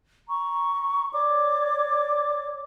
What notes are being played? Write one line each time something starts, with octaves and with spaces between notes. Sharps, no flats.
A#5 C#6
C#5 D5 D6